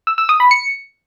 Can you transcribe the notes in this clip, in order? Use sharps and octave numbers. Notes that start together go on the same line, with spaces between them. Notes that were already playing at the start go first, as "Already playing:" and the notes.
E6
E6
D#6
B5
C#7